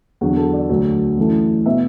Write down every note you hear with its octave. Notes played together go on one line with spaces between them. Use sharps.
E2 D3 F#3 F#4
A4
D5
D2 D3 F#3
F#2 E3 A3
B2 B3 E5